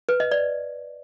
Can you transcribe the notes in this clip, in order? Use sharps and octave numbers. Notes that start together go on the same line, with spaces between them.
B4
D#5
D5